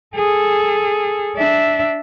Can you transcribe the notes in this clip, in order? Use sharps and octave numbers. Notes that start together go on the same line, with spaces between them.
G#4 A4
D4 E5